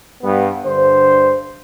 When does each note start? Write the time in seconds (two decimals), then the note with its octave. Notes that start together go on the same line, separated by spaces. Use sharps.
0.23 G2 G3 B3
0.65 G2 D3 C5